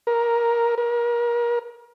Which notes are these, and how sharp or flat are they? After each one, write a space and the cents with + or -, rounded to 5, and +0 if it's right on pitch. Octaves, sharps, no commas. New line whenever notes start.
A#4 +10
A#4 +30